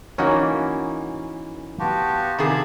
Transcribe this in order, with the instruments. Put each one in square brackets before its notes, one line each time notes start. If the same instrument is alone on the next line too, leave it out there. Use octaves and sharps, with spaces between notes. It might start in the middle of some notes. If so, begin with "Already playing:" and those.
[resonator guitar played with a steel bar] E3 A#3 [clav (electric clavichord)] C#4 D#4 F#4
[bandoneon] B3 F#4 G4 [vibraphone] F5 A5 C6
[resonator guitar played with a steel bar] C3 D#3 G#4 [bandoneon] A5 B5